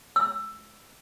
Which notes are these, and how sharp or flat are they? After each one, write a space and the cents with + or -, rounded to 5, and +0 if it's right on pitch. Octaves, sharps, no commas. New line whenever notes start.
E6 +15